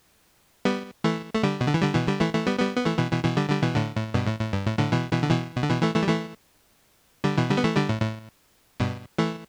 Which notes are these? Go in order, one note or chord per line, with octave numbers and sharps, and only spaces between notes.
G3 B3
E3 A3
A3
D3 G3
B2
D3
E3
D3 G3
B2 E3
D3 G3
E3 A3
E3 A3
G3 B3
G3 B3
B3
E3 A3
B2 E3
B2 E3
B2 E3
D3 G3
D3 G3
B2 E3
A2 D3
A2
G2 B2
A2
A2
G2
A2
A2 D3
B2 E3
B2 E3
D3
B2 E3
B2
D3
B2 E3
E3 A3
E3 A3
G3
E3 A3
D3 G3
B2 E3
D3 G3
B3
E3 A3
D3 G3
A2
A2
G2 B2
E3 A3